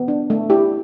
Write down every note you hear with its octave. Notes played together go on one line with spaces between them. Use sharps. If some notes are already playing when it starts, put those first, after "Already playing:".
Already playing: B3
D4
A3
E4 G4